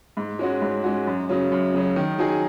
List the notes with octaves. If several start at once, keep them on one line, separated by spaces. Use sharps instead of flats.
G#2
G#3 C#4 F#4
G#2
G#3 C#4 F#4
F#2
C#3 F#3 C#4
F#2
C#3 F#3 C#4
D#3
F#3 D#4 G#4